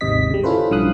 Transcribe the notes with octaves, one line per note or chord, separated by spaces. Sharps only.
G#1 D#2 G#2 C3 D#5 B6
C#3 G3
C#4 E4 F4 A4 B4 C5
B1 G2 F3 F5 D#6 F#6